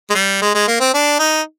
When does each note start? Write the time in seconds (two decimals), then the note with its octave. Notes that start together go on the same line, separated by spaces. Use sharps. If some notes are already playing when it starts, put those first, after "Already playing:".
0.10 G#3
0.15 G3
0.42 G#3
0.54 G#3
0.68 A#3
0.80 C4
0.94 D4
1.19 D#4